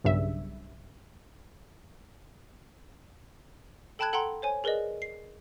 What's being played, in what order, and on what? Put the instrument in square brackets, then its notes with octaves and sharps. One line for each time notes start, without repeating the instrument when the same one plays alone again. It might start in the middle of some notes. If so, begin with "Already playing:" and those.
[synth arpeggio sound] B1 G2 C#3 E5
[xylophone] A4 G5 A5 B5 F#6 G#6
A4 F#5 G5 A#5 C6
C5 C#5 G#5
G#4 A#4 B4 D5 D#5
C7